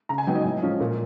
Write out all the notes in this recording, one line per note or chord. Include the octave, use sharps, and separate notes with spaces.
C#3 A#5
G#5
F#3 B3 D#4 G5
D#5
A2
F3 G#3 C#4
A#2